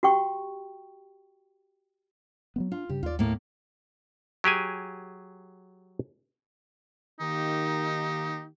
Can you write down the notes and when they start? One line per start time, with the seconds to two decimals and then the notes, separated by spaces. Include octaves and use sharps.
0.03 F#4 G4 G5 C#6
2.56 F#3 G#3 B3
2.72 D4 F4
2.89 G2 C#3 G4
3.03 D#2 F4 D5
3.19 A2 A#3
4.44 F#3 G4 G#4 G#5
7.20 D#3 A#3 D#4 G4